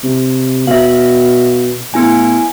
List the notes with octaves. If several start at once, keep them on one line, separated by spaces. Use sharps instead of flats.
C3
B2 E5 F5
A2 B3 E4 G#5